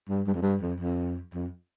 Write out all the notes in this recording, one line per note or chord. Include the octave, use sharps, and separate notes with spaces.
G2
G2
F2
G2
F2
F2
F2